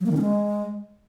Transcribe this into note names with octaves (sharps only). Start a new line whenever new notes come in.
F#3
A#3
D#3
C#4
G#3